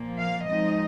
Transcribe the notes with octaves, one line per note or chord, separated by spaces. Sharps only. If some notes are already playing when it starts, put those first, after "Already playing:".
Already playing: A#2 F3 A#3
F5
F3 G#3 C4 D#4 D#5